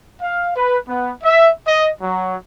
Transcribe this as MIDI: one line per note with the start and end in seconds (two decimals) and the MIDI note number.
0.22 0.51 77
0.56 0.78 71
0.89 1.13 59
1.23 1.50 76
1.67 1.88 75
2.01 2.36 54